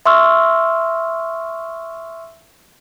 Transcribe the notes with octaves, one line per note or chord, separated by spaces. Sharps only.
E5 C6 C#6 E6 F6